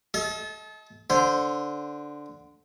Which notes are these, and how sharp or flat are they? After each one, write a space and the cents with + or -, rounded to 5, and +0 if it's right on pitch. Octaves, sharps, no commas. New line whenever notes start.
A4 -30 D#5 +35
D3 +0 C5 +0